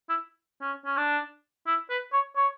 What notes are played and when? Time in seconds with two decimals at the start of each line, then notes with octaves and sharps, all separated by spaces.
0.09 E4
0.62 C#4
0.86 C#4
0.97 D4
1.67 E4
1.90 B4
2.13 C#5
2.36 C#5